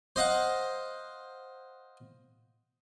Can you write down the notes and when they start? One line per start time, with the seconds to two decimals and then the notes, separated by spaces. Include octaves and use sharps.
0.16 C5 D#5 F5 F#5